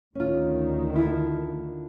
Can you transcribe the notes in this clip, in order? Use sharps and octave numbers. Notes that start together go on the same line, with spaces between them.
D2 D#3 C#4 F4
D3 E4 F4